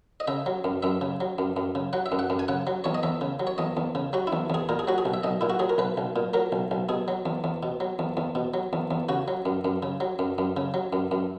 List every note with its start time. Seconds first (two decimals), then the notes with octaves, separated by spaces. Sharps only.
0.20 D#5
0.28 C#3 E5
0.46 F#3
0.64 F#2
0.83 F#2 E5
1.01 C#3
1.21 F#3
1.38 F#2
1.57 F#2
1.75 C#3
1.93 F#3 F#5
2.06 E5
2.12 F#2
2.19 F#5
2.30 F#2
2.39 G#5
2.48 C#3 F#5
2.67 F#3
2.84 E2 C#5
2.95 D#5
3.03 E2 E5
3.21 C#3
3.40 F#3
3.47 C#5
3.58 E2 D#5
3.77 E2
3.95 C#3
4.13 F#3 F#4
4.27 E4
4.33 E2
4.50 E2 G#4
4.69 A#2 A#4
4.79 G#4
4.87 F#3 F#4
4.98 G#4
5.05 B1
5.14 E5
5.23 B1 D#5
5.41 A#2 E4
5.50 F#4
5.59 F#3 G#4
5.70 A#4
5.78 B1 B4
5.97 B1
6.16 A#2
6.34 F#3 A#4
6.52 B1
6.71 B1
6.89 B2 G#4
7.08 F#3
7.26 E2
7.44 E2
7.63 B2
7.80 F#3
7.99 E2
8.17 E2
8.35 B2
8.54 F#3
8.73 E2
8.91 E2
9.09 C#3 F#4
9.28 F#3
9.46 F#2
9.65 F#2
9.83 C#3
10.00 F#3
10.19 F#2
10.38 F#2
10.57 C#3
10.74 F#3
10.93 F#2
11.11 F#2